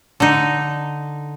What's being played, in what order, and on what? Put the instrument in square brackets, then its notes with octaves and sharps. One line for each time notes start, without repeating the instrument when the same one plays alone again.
[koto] D3 D#4